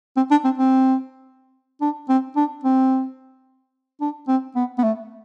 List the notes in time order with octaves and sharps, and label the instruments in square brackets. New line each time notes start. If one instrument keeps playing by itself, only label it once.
[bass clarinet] C4
D4
C4
C4
D4
C4
D4
C4
D4
C4
B3
B3
A3